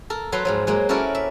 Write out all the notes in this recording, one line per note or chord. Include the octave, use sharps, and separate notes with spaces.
A4 A#4
F#3 A4 B4 F#5 A#5 C6
G#2 F3 F#3
F#3 G#3 A#3
C#4 E4 F#4 A4 A#4 D5
E5